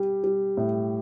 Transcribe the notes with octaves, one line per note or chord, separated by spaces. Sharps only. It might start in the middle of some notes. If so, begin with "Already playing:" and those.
Already playing: G3 G4
G3
A2